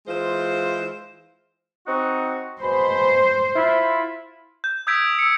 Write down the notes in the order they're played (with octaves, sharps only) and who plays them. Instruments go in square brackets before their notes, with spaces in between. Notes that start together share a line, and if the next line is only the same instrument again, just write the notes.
[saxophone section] E3 G#3 F4 C5
[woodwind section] C4 D#4 F#4
[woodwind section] B2 G#3 B5 [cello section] C5
[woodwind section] E4 F4
[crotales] G6
D#6 E6 G6 G#6 B6 D7
E6 C#7